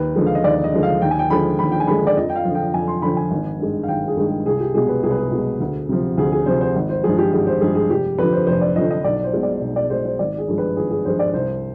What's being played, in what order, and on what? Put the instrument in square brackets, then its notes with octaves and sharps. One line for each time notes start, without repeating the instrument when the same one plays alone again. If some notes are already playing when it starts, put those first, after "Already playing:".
Already playing: [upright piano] D#2 B4
D3 F3 G#3
F5
D#5
D#2 D5
D#5
D3 F3 G#3
F5
D#2 G5
G#5
G5
D3 F3 G#3 B5
D#2 B5
G5
G#5
D3 F3 G#3 B5
D5
F2 D#5
G5
F5
D3 F3
G5
F2 G#5
C6
D3 F3 B5
G#5
G#1
G2 D#3 G#3
F5
G#1 G5
G#4
G2 D#3 G#3
G#4
C2 G#4
G4
B2 G#3 G#4
B4
C2 G#4
B4
G#4
B2 G#3
D2
C3 F3
D2 G#4
G#4
C3 F3 C5
C5
G#1
C5
G2 F3 G#3 G#4
G4
G#1 G#4
C5
G2 F3 G#3 G#4
G#4
F1 G4
F2 D3 F3 B4
C5
F1 C5
D5
F2 D3 F3 D#5
D#5
B1 D5
C5
B2 G#3
D5
B1
D5
B2 G#3 C5
C5
G#1 D5
G#4
G2 F3 G#3
B4
G#1 G#4
G#4
G2 F3 G#3 C5
D5
C2 C5